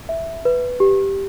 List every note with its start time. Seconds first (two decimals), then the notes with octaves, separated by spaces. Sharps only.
0.09 E5
0.45 B4
0.80 G4